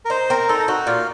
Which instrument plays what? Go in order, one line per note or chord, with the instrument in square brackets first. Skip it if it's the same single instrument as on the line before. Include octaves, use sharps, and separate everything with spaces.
[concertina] A#4
[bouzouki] D#4 [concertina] C5
[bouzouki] C4 [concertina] A#4
[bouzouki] D#4 [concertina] A4
[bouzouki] D#4 [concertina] F#4
[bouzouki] A#2 [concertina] F4